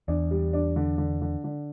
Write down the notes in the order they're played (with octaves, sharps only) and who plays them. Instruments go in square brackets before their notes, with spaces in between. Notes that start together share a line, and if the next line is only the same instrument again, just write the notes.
[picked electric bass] E2 [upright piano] D4
[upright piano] G3
D4
D3
D3
D3
D3